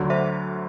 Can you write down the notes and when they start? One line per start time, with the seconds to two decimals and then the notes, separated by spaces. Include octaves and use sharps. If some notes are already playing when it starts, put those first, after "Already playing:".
Already playing: D2 D3 F#3
0.10 C5 E5